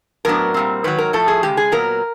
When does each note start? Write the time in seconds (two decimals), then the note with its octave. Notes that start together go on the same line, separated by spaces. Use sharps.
0.25 A2 F#3 B3 D4 A#4
0.54 A#2 G3 C4
0.84 G#2 D#3 F#3 B4
0.98 A#4
1.13 A2 F3 A3 A4
1.28 G#4
1.43 C#3 E3 G#3 G4
1.57 G#4
1.72 A#2 F#3 B3 A#4